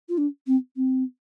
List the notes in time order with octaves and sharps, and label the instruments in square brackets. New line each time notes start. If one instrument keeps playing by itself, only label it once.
[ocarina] F4
D4
C4
C4